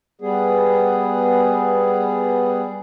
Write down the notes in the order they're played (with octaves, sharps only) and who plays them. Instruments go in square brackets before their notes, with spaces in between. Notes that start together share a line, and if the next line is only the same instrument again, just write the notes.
[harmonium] G3 B3 G#4